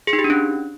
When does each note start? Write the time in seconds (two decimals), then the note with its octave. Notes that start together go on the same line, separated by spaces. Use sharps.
0.07 G#4
0.13 D#4
0.19 G4
0.24 D4
0.30 C#4